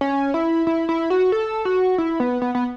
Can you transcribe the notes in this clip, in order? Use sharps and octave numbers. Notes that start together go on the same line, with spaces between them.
C#4
E4
E4
E4
F#4
A4
F#4
E4
B3
B3
B3